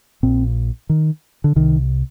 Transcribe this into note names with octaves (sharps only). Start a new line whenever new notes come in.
A#1 A#2 C4
D#3
D3
C2 C3 D#3